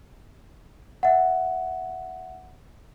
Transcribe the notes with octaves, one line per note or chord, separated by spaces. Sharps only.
E5 F#5